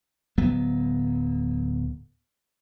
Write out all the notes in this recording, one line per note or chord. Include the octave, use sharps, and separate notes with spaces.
D1 F#3 B3